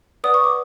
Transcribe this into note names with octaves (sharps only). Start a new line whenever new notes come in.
B4 D5 F#5 D#6
C#6
D6